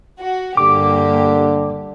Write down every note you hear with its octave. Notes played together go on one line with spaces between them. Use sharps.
F#4
G2 D3 A#3 G4 D6